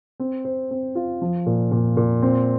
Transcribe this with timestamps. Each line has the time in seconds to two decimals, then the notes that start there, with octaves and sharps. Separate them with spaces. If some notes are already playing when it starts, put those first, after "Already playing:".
0.20 C4
0.45 C5
0.71 C4
0.95 F4
1.22 F3
1.46 A#2
1.71 A#2
1.97 A#2
2.22 C4